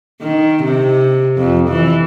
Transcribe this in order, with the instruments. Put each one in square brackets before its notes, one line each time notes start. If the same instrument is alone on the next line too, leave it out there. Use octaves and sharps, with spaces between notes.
[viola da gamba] D#3
C3
F2
E3